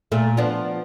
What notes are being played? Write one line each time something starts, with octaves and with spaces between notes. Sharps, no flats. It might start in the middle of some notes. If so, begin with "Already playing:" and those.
A#2 A3
F3 B3 D4